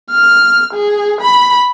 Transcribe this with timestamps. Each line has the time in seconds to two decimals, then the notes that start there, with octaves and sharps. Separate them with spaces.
0.11 F6
0.74 G#4
1.21 B5